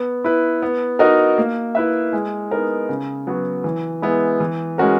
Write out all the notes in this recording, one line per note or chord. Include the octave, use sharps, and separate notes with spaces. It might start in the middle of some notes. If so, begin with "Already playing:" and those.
Already playing: B3
E4 B4
B3
D#4 F#4 A#4 D#5
A#3
E4 B4 E5
G#3
B3 D#4 A#4
C#3
F#3 B3 F#4
E3
G#3 B3 E4
E3
G#3 C#4 F#4 A#4